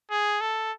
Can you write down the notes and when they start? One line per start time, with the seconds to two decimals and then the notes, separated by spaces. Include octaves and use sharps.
0.11 G#4
0.41 A4